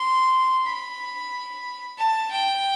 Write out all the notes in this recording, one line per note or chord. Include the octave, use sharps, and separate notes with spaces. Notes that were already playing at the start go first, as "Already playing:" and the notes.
Already playing: C6
B5
A5
G5